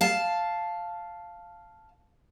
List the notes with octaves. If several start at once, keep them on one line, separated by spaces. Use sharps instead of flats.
F5 A5